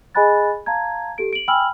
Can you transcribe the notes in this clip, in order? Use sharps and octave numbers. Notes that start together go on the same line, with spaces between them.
G#4 D#5 G#5 B5 F#6 A6
F5 A5 A#5 G#6
G4 A4 D7
D7 F#7
G5 G#5 B5 E6 F6 F#7